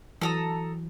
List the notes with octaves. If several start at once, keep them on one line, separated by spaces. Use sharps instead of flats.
E3 F#3 A4 A#5 D#6